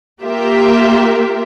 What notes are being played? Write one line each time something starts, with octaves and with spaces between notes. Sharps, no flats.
A#3 F4 G4 A#4 E5